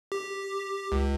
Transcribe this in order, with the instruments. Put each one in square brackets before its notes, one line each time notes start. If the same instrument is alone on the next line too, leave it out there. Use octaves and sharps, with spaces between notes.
[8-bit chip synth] G4
C#2